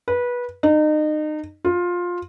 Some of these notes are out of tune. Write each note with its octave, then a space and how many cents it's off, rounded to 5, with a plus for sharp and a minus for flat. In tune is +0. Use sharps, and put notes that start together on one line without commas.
B4 -20
D#4 -30
F4 +15